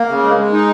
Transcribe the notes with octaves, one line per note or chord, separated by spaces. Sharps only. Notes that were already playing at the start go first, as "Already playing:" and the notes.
Already playing: A#3
C#3
G#3
G#3
D#4